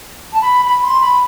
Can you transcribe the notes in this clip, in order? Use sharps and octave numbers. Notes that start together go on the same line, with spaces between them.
A5
B5
B5
C6
B5